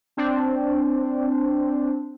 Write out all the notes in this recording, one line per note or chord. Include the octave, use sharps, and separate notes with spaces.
C4 D4